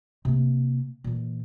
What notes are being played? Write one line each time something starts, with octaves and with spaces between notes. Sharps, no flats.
C3 A#3
A#2 E3